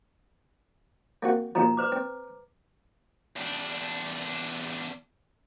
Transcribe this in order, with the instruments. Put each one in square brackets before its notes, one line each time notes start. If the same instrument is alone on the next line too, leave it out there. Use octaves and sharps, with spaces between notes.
[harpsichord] A#3 C4 F#4
[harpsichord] D#2 B2 F3 [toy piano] A#5
[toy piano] B4 C5 D6
[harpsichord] C4
[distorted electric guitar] E2 D4